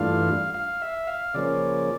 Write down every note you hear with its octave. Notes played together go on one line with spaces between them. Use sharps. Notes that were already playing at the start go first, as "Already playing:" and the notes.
Already playing: G2 E3 A3 D4 F4 F5
F5
E5
F5
C#3 F3 A#3 C#4 D5